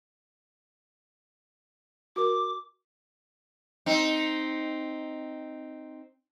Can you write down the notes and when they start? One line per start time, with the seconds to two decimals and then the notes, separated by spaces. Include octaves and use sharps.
2.16 F#4 A#4 D6
3.86 C4 D#4